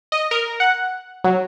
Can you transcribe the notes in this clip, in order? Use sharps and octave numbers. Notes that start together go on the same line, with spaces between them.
D#5
A#4
F#5
F#3